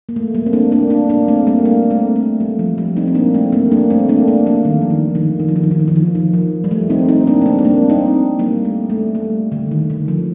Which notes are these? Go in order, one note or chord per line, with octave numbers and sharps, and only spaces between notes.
A#3
A3
G3 A#3
C4
A#3 D4
A#3 D4
A#3 D4
A#3 D4
A3 C4
G3 A#3
A#3 D4
A3 C4
A3
G3
F3
G3
C4 D#4
C4
A#3 D4
A3 C4
G3 A#3
A#3 D4
A3 C4
A#3 D4
A#3 D4
G3 A#3
D#3
F3
D#3
D#3
D#3
F3
D#3
F3
D#3
F3
D#3
F3
D#3
D#3
F3
G3
A3
C4 D#4
C4 D#4
A#3 D4
C4
G3 A#3
C4
A#3 D4
C4 D#4
G3 A#3
A3
A3
G3
D3
D#3
D3
F3